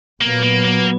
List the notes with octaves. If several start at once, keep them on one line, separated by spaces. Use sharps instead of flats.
A#2 F#3 A#3 B3
A#3
A#3